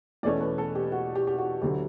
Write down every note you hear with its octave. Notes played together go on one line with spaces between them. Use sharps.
E2 B2 A3 C#4 D5
B4
A4
G4
F#4
G4
G4
F#4
D2 D3 F#3 G4